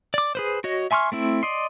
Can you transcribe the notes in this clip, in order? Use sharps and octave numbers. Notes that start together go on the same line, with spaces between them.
D5 D6
G#4 B4 C5
F#4 C#5 D#5
E5 G#5 C6 C#6 F6
A3 C4 E4
D5 D#5 C6